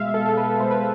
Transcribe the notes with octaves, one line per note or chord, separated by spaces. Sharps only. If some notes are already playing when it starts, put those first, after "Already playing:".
Already playing: B2 G#3 E5 F5
B2 G#3 A4
A4
B4
B2 G#3 C5
B4